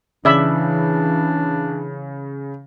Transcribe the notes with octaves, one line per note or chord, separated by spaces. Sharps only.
C#3 E3 D4 D5 E5 B5